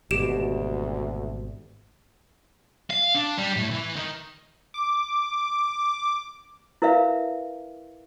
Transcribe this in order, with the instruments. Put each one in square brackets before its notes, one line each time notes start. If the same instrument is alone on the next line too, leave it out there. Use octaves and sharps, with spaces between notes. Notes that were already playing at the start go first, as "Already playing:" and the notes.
[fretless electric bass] G#1 B2 [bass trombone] D2 [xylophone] G4 D7 E7
[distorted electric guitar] F5
D4
G3
A2
E3
D#3
[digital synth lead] D6
[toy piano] E4 A#4 B4 E5 F5